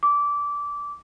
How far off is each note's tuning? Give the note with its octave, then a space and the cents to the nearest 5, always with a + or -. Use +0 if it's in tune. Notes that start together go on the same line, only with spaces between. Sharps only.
D6 -20